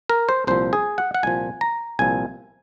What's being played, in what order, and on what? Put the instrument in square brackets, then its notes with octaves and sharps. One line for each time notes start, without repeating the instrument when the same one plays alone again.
[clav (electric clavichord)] A#4
C5
C2 A#2 F3 C5
G#4
F#5
F#5
C2 A#2 F3 G#5
A#5
C2 A#2 F3 G#5